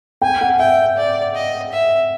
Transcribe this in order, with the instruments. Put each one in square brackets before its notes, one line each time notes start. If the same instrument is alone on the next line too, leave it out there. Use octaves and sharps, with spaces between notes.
[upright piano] G5 [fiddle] G#5
[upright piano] F#5
[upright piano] E5 [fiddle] G5
[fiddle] D5
D#5
E5